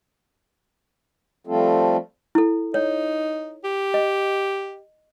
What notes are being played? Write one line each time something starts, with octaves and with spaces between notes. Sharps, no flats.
F3 G3 A3 C4 F4 A4
E4 A4
D#4 C#5
G4
D#5